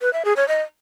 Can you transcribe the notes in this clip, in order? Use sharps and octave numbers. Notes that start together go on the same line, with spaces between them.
B4
E5
G#4
C#5
D#5